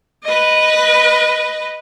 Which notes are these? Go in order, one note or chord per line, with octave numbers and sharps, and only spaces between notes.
B4 D#5